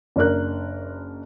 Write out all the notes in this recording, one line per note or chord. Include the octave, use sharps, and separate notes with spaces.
F#1 D4 A#4 F#6